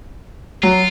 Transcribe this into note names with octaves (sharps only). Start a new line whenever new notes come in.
F#3 F4